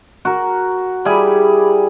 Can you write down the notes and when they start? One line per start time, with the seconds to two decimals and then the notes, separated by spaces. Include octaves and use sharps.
0.25 F#4 A#4
1.05 G3 E4 G4 G#4